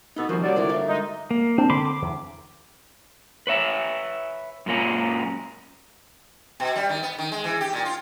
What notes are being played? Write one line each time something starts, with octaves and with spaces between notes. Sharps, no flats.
B2 B3 D#4 A4 B4 D#5
C3 D#3 F3 F#3 A#3 C#4 F#4 C5
G3 F#4 C#5 D5
D3 G3 G#3 E4 F4 C5
G2 F#3 A#3 E5 F5
G#3 D#4
A#3
C4 D4
D3 C4 B5 C6 D6
D6
E2
B4 C#5 E5
F#2 A#2 A#3 C#4
B2
G3
D#3
B3
D#3
G#3
E3
G4
A#2
F4